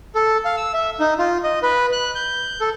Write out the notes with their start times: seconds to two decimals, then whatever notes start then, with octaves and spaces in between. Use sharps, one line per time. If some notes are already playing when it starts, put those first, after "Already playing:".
0.15 A4
0.45 F5
0.57 E6
0.74 E5
1.00 D#4
1.18 F4
1.44 D#5
1.63 B4
1.92 F#6
2.15 G6
2.61 A4